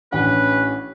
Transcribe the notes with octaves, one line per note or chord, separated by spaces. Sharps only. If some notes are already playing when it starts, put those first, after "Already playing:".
A1 C#4 D4 B4 F#5